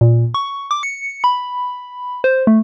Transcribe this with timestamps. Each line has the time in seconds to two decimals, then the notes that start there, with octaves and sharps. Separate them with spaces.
0.01 A#2
0.34 C#6
0.71 D6
0.83 C#7
1.24 B5
2.24 C5
2.47 A3